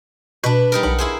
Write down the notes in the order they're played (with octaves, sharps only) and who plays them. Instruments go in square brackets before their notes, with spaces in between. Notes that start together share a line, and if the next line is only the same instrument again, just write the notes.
[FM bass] B2 [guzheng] D4 B4
[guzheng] G3 D#4 A#4
[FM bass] B1 [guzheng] F#5
[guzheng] E4 G#4 C5